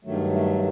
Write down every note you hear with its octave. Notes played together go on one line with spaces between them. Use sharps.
G2 D#3 F#3 A3
A3